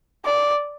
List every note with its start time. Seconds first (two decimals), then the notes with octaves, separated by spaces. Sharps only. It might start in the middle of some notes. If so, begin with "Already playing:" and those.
0.25 D5